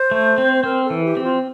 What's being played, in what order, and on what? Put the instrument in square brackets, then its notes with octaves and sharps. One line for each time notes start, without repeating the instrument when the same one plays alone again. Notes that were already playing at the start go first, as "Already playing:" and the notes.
Already playing: [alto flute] C5
[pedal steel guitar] A3
C4
[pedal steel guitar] C4 [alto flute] A#4
[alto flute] A4
[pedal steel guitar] E3
[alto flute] G4
[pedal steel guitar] C4
[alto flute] F4